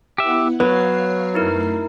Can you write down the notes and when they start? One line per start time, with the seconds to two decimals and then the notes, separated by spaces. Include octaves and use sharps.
0.18 B3 E4 G4 E5 F#5
0.60 F#3 B3 C#5 F5 C7
1.34 F#2 A3 D#4 E4 A#4 C7